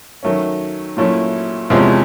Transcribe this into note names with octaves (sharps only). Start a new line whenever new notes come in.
D#3 F#3 A3 C#4
A#2 F#3 A3 C#4 E4
E2 C3 F3 G#3 C#4